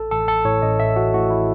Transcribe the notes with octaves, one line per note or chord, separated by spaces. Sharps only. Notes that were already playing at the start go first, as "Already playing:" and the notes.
Already playing: A1 A4
A1 A4
E3 A4
A2 C#5
A1 D#5
A1 E5
E3 F#4
A2 F#4
E4